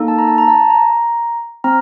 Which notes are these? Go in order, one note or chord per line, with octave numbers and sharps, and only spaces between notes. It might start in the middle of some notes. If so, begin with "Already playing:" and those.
Already playing: A#3 D#4 A4
A5
A#5
A5
A#5
A5
A#5
C4 A#5